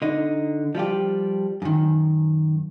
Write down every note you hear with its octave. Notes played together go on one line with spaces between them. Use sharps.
D3 D#4
F3 G3 F4 G4
F#2 D#3